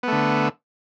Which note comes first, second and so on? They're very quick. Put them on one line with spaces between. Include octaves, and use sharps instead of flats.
B3 A3 D3